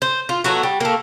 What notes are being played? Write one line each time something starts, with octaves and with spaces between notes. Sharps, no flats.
C5
F4
F#3 A3 B3 F#4
G3
A3 A#3